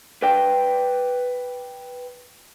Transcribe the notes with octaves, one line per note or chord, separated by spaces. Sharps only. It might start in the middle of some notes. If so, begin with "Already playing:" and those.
B4 D5 G5